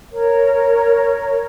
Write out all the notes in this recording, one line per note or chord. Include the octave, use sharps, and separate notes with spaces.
A#4 C#5